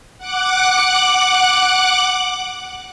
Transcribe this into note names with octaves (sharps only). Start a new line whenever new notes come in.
F#5 D6 F#6